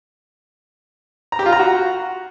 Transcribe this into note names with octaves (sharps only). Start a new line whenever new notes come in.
A#5
G4
F4
A#5
F#4